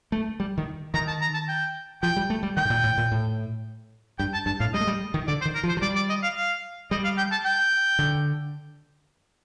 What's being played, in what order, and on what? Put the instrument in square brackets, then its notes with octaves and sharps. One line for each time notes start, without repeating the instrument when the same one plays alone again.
[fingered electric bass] A3
G3
D#3
[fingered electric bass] D#3 [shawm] A#5
[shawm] A5
A#5
A5
G5
[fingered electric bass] F3 [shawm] G5
[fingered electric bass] G3
A3
G3
[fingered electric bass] D#3 [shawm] G5
[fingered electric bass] A2
A#2
A2
A#2
A2
[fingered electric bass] G2 [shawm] G5
[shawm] A5
[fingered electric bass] G2 [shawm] A5
[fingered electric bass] A2 [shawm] F5
[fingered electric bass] G3 [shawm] D#5
[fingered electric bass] A3
G3
D#3
[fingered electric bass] D3 [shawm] D5
[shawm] C5
[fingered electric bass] D#3
[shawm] A#4
[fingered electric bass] F3
[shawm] C5
[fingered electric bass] F3
[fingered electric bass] G3 [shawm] D5
[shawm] D5
D#5
F5
F5
[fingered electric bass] G3 [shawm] D#5
[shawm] F5
G5
A5
G5
[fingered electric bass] D3